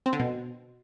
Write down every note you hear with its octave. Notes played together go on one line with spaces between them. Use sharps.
C4
D3
B2